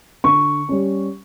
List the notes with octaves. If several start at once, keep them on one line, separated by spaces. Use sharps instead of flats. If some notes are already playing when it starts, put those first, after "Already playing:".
D3 C#6
G3 C#4